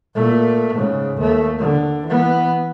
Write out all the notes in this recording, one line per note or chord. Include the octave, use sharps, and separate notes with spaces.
A#2 A3
G#2 C#3
D#2 A3
D3
E3 B3